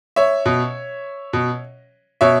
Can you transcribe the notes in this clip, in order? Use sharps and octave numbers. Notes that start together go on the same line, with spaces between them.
C#5 E5
B2
B2
B2 C#5 E5